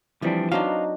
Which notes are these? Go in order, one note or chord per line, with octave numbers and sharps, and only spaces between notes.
E3 F3 G3 C4 D4
F#3 D4 D#4 B4 C5 F5